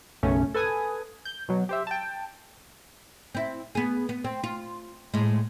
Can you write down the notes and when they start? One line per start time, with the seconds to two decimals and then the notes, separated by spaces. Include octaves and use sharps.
0.23 B1 F#2 C#3 A3 C#4
0.55 A4 B4 G#5 D#6
1.25 G6
1.48 B2 F#3
1.69 G4 C5 E5
1.87 G5 A5
3.35 C4 E4
3.75 B3 G#4
4.09 B3
4.24 C4
4.44 F4
5.14 A2 G#3